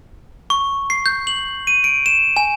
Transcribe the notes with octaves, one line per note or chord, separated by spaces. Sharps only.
C#6
C7
G6
F#7
D#7
D7
E7
G#5